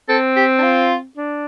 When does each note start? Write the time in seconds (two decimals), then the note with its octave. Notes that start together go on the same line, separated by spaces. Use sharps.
0.09 C4 A4
0.36 G4
0.59 D4
0.63 F4
1.17 D4